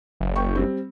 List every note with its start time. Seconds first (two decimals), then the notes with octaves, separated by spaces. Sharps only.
0.20 F#1
0.36 G5 C#6
0.55 G3 C4